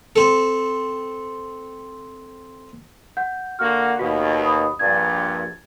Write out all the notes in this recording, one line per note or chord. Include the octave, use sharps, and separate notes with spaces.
C4 A4
F#5 G6
D3 A#3 F#4 F6
D#2 B2 F#4 F#5
B5 D#6
A#1 G2 G#6 A6